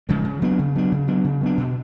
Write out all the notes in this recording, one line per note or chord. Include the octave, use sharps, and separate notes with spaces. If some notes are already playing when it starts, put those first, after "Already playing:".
C#3 F3 G#3
C#3
F#3 B3 D4
C#3
F#3 B3 D4
C#3
F#3 B3 D4
C#3
F#3 B3 D4
B2